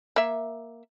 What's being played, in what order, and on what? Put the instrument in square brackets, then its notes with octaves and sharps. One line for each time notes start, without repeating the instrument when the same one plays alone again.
[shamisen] A#3 E5